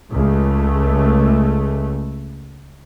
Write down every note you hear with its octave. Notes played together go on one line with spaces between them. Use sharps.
C#2 A3